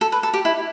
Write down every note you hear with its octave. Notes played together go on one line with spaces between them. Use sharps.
A4
B4
A4
G4
E4